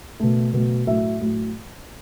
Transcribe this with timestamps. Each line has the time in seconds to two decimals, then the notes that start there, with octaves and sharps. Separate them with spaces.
0.20 B2 A3
0.53 B2 F#3 A3
0.87 A2 F#3 A3 E5
1.20 A2 F#3 A3